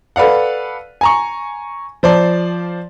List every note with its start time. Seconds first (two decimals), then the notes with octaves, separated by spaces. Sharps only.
0.16 A4 B4 D5 F5 F#5
1.01 G#5 A#5 C#6
2.03 F3 C5 D5 A5